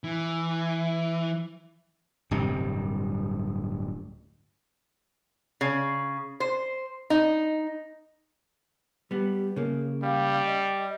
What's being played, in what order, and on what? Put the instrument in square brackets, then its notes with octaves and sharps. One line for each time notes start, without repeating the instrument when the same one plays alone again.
[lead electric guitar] E3
[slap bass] D1 G2 C3 G3
[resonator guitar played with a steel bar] C#3
C5
D#4
[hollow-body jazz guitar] G3 B3 [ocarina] G4
[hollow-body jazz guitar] C#3 A#3 [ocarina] G#4
[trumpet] G3 [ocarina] F5
[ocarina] D#5